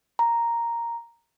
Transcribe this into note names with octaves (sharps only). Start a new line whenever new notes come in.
A#5